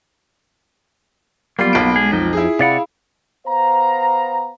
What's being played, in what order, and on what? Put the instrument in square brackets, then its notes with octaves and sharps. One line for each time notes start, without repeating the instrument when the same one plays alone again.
[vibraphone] F#3 B3 B5 [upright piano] G3 [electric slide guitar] A#3 F4
[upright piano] B1 D7
[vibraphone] G#3 [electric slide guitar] G#4
[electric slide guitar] F2 D#4 [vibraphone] F4
[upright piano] E4 G#4
[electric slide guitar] C3 D5 F#5 [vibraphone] F5 B5
[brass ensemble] B3 C5 F5 A#5